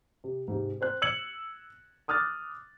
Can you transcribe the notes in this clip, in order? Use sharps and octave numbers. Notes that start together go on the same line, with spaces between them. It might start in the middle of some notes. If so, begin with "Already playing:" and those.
C3
G#2 C3
C4 C5 F#6
E6 G#6 C#7 F#7
D6 D#6 F6 F#6 A6